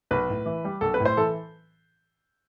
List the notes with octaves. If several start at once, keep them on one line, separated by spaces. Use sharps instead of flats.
B1 B4
A2
E3
G3
B1 A4
B4
A2
C5
E3 A4